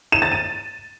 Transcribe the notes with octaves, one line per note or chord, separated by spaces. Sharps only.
E7
A6
D#7